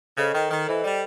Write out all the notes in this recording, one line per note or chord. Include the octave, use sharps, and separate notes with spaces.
C#3 A4 C5 D#5
D#3
D#3
E3 A4 C5 D#5
G3